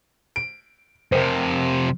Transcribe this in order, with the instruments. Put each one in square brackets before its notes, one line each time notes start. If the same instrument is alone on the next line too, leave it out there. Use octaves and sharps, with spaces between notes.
[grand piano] D7
[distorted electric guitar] F2 C3 [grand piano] A#4 C5